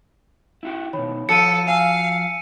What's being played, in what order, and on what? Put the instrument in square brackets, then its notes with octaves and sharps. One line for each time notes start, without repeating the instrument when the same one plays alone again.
[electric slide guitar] E4 F#4 G4
[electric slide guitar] B2 D#3 [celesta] C#5 B5
[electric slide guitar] F3 F#4 [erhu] A4 [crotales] C#7 D#7
[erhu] F5 [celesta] G#5 A5 E6